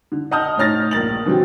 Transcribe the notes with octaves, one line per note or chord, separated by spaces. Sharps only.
D3
D#5 F#5 A5 D#6 F6 G6
A2 D#4 C#5 F6 A6 A#6
A#1 A#4 A6 F#7
B2 D3 E3 F#3 G3 C4